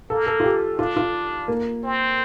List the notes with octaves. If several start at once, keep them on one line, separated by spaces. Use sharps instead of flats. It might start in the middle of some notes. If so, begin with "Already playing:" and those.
A#3 A4
A4
F4
G4
D4 F4
F4
A#3
C4